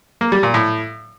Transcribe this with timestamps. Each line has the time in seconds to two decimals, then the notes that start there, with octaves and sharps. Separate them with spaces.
0.21 A#3
0.32 G3
0.43 A#2
0.54 A2